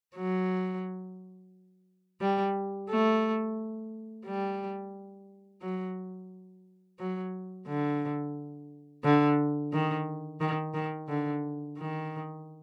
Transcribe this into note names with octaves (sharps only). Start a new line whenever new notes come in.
F#3
G3
A3
G3
F#3
F#3
D3
D3
D#3
D#3
D#3
D3
D#3